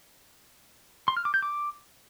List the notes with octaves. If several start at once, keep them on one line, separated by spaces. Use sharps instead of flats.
C6
F6
D6
G6
D6